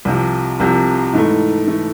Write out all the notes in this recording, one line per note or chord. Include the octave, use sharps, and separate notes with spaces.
C2 C3 F3
C2 C3 F3
G#2 E3 A3
E3 A3